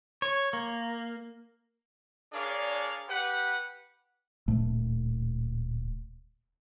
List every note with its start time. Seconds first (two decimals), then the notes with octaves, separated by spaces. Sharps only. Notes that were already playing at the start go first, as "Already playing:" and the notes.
0.22 C#5
0.53 A#3
2.33 D4 G#4 A#4 C#5 D5 F5
3.09 G4 B4 F#5
4.48 D1 A#2 A3